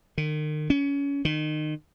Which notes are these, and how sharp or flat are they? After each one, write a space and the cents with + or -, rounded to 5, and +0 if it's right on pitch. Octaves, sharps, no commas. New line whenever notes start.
D#3 -35
C#4 +25
D#3 -25